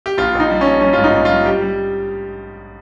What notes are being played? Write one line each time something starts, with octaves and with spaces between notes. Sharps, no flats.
G4
A#1 F4
A#1
D#4
G3
A#1 C#4
G3 C#4
G#2 F4
D#4
A#1
G3 F4
G3 G4
G3